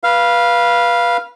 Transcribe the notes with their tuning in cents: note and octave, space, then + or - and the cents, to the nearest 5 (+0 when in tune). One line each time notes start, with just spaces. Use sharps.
B4 -20 F5 -5